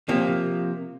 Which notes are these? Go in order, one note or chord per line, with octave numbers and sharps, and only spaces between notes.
C3 F3 A#3